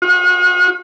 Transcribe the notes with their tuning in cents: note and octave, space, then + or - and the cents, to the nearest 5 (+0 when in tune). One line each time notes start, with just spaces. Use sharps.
F#4 -45